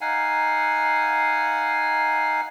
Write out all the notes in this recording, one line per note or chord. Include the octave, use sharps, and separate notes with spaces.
D#4 F5 F#5 G#5